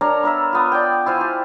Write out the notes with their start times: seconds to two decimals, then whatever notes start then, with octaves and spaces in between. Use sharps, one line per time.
0.01 D4 A#4 C#5 A#5
0.23 B3 A#4 E5
0.53 B3 F4
0.72 D5 G5
1.06 E4 F4 C5 G#5
1.21 G4